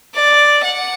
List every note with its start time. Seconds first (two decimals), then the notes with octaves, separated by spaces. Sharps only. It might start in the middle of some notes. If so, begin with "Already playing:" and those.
0.14 D5
0.64 F#5